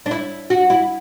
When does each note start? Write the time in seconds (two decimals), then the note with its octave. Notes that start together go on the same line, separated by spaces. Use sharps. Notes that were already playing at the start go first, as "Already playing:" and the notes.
0.06 D4
0.11 E4
0.50 F#4
0.70 E4